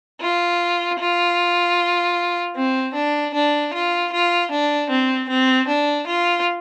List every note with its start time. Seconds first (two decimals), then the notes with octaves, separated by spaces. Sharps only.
0.21 F4
1.00 F4
2.56 C4
2.94 D4
3.34 D4
3.74 F4
4.12 F4
4.51 D4
4.90 C4
5.29 C4
5.68 D4
6.07 F4